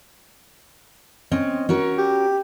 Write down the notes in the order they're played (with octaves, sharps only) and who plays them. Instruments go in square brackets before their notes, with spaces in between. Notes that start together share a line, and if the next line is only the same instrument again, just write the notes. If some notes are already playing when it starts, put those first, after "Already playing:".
[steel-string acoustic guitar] C4 C#4 D#5
C#4 F#4 A#4
[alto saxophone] G4